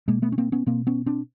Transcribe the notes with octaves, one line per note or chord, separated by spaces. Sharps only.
B2 G#3 A#3
A3 B3
C#4
A#3 C4
B3 C#4
B2 A#3 C4
B3 C#4
C4 D4